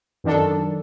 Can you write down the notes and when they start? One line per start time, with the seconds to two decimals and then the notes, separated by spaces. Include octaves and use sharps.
0.24 F#2 D#3 D4 A4